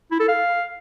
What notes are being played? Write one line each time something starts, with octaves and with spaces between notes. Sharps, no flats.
E4
A4
F5